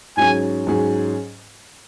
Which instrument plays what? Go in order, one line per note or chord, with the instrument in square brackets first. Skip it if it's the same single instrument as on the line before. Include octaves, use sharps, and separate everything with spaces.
[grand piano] G#2 F#3 C#4 G#4 [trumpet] G#5
[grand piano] G#2 F#3 C#4 G#4